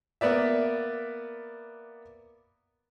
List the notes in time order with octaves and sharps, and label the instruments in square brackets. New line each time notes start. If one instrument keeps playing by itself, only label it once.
[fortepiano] A#3 B3 B4 D5 E5